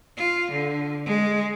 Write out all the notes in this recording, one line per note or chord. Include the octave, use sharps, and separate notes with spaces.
F4
D3
G#3